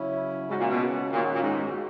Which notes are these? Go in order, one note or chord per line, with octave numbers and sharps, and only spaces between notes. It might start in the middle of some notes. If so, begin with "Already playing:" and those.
Already playing: C#3 F#3 C#4 E4
G#2 C#3 G#3 C#4 F#4
A#2
B2
A#2 D#3 A#3 C#4 F#4
A#2
G#2